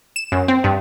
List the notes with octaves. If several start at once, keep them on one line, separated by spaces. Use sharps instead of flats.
E7
F#2
C4
G2